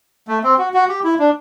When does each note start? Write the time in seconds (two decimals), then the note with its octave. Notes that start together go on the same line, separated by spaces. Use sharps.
0.28 A3
0.44 C4
0.58 F#4
0.74 F#4
0.89 G4
1.04 E4
1.19 D4